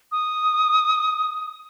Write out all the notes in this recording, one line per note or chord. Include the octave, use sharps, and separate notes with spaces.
D#6